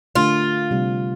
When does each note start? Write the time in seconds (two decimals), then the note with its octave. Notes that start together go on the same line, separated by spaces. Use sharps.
0.15 D3 A3 D4 F4 G4 A#4
0.71 C3 G3 C4